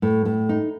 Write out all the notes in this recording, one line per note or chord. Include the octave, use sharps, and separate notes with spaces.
A2
A2
D#4